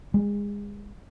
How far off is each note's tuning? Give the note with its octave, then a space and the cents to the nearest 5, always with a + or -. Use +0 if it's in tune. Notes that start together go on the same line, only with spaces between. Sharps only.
G#3 -30